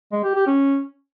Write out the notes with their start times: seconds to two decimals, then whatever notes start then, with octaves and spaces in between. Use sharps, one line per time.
0.12 G#3
0.24 G4
0.35 G4
0.47 C#4